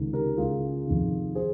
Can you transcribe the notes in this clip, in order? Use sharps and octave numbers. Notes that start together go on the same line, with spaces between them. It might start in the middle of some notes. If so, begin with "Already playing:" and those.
Already playing: C#2 C3 D#3
G4 A#4
C#2 C#3 F4 G#4
F2 C3 D#3
D#3 G#4 C5